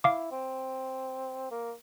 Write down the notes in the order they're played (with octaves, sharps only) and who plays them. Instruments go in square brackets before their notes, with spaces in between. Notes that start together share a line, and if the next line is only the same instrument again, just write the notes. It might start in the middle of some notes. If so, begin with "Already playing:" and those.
[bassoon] E4 [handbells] F5 D6
[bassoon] C4
A#3